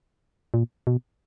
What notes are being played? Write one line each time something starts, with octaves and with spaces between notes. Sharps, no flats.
A#2
B2